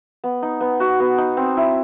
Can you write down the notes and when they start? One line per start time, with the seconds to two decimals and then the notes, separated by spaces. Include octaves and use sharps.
0.24 B3
0.42 D#4
0.61 B3
0.80 F#4
1.00 B3
1.18 D#4
1.37 C4
1.57 E4